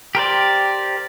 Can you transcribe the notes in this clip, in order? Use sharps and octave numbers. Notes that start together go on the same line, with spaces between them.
G4 A#4 C5 D5